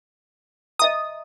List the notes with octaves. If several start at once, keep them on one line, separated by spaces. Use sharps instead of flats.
D#5 E5 A#5 D#6